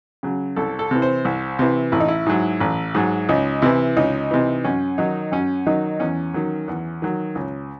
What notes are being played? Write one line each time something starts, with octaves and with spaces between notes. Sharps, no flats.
C#3 F#3
C2 A4
A4
C3 E3
C5
C2
C3 E3
A1 E4
D#4
E4
G#2 F#3
A1
G#2 F#3
C#2 D#4
C3 E3 E4
C#2 D#4
C3 E3
F#2 C#4
D#3 F#3 D#4
F#2 C#4
D#3 F#3 D#4
E2 C#4
D#3 F#3
E2
D#3 F#3
C#2